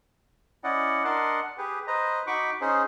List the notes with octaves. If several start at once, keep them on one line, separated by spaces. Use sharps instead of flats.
C#4 E4 D5 D#5 F#5
D4 A#4 D#5 F#5 A5 C6
G4 G#4 B4
B4 C5 D#5 A#5
D#4 F#4 B5 C#6 D6
C#4 D#4 G#4 C5